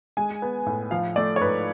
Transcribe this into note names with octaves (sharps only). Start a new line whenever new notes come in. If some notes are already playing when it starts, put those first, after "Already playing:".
G#3 G#5
B3
A2
F3 F5
A3 D5
C#5
G#2 B4